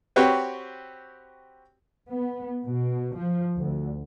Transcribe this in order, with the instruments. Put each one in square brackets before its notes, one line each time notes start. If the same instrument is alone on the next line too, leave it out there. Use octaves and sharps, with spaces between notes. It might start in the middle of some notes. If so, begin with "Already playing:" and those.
[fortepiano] C4 F#4 G4 B4 C#5
[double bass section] B3
B2
F3
D2